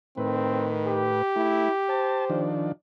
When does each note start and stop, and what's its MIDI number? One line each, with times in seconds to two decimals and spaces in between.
0.17 1.22 45
0.17 1.16 51
0.17 0.69 60
0.17 1.22 71
0.87 2.65 67
1.36 1.69 57
1.36 1.70 64
1.89 2.48 72
1.89 2.25 81
2.30 2.72 51
2.30 2.72 53
2.30 2.72 62